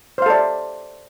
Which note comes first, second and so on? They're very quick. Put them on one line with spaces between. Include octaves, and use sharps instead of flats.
C5 F5 A4 D5 E5